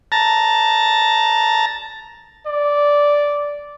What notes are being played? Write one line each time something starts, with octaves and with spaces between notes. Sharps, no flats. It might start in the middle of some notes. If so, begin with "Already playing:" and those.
A5 A#5
D5